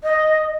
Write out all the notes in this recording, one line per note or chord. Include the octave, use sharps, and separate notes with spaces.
D#5